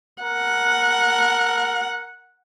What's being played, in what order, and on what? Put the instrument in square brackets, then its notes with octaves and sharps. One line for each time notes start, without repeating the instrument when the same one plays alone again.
[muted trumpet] A#4 [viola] F#5